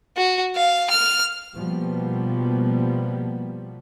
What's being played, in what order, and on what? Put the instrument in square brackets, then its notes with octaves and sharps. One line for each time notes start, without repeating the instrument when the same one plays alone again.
[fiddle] F#4
F5
F6
[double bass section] B2 F3 G3 A#3 B3